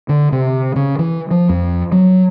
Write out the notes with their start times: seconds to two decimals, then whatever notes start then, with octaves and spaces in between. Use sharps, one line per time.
0.09 D3
0.32 C3
0.76 C#3
0.99 E3
1.31 F3
1.49 F2
1.92 F#3